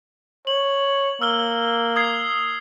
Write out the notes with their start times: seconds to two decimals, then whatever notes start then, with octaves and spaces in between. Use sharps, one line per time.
0.47 C#5 F#7
1.22 A#3 E6 F6 G7
1.96 D#6 G#6 C7